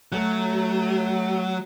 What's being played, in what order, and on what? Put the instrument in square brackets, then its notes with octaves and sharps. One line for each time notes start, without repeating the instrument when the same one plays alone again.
[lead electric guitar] F#3 [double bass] A3